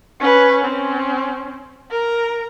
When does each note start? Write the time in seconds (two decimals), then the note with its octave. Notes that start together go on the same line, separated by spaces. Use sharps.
0.20 C#4 B4
0.64 C4 C#4
1.91 A#4 A#5